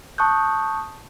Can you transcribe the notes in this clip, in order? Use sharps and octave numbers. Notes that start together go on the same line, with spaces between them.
A5 C#6 D#6 F#6 G6